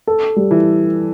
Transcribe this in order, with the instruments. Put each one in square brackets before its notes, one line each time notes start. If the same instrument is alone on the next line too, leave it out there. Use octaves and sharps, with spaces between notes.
[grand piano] A4
G3
[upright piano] E3